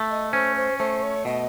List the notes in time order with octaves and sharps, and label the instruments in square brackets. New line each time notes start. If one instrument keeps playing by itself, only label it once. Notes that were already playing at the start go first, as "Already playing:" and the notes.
Already playing: [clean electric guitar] A3
[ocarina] D#5
[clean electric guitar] C#4 [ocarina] C5
[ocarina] C5
[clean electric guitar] A3 [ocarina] C5
[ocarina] C#5
[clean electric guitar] B2 [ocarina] D#5